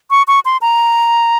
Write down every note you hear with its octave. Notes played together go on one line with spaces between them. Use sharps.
C#6
C#6
C6
A#5